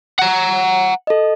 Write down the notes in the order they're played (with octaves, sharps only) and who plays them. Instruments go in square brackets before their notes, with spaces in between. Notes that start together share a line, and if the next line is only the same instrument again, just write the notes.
[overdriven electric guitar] F#5 A#5
[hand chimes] A4 D#5